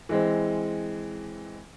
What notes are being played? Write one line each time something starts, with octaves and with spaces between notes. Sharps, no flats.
E3 G#3 C4